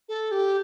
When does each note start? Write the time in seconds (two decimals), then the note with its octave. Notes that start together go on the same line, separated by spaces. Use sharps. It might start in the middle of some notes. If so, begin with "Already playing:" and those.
0.09 A4
0.31 G4